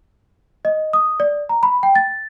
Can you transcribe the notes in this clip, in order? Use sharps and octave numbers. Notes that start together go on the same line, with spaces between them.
D#5
D#6
D5
A#5
B5
G5
A6